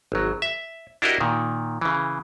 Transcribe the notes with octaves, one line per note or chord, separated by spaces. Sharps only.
G#1 F#3
E5
D4 E4 F#4 G4 A#4 D#5
A#2 D#3
C#3 E3